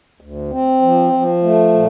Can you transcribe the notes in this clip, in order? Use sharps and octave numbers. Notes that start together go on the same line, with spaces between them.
D2
C4
F3
F3
A3
A#2